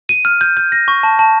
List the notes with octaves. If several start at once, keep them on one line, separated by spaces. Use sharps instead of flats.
D#7
F6
G6
G6
A#6
C#6
A5
A5